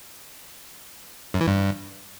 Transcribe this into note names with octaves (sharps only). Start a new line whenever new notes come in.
F#2
E3
G2